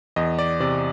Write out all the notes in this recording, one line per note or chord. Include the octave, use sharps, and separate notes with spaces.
E2 D#5
D5
C3 D5